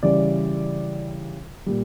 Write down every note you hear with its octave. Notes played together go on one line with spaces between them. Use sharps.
C#3 E3 G3 D5
A#2 G3